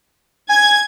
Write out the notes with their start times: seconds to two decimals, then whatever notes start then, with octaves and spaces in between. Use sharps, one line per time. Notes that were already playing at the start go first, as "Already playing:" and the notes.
0.49 G#5 G#6